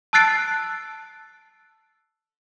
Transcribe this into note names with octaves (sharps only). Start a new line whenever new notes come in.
A5 E6 F#6 A6 C7 D7